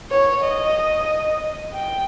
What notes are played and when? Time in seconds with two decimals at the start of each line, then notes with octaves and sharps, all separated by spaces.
0.11 C#5
0.43 D#5
1.74 G5